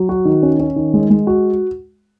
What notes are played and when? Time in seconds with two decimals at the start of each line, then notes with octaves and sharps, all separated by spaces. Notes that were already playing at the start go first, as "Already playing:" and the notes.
Already playing: F#3
0.09 F#4
0.25 D#3
0.43 C#4
0.59 C#4
0.76 D#3
0.94 G#3
1.10 G#3
1.27 F#4